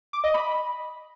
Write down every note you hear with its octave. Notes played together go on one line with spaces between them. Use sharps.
D6
D#5
B5